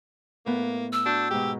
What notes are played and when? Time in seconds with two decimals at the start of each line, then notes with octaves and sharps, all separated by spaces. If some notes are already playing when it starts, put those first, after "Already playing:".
0.46 A2 A#3 B3
0.93 E6
1.06 D4 F#4 G6
1.31 G#2 B2 G4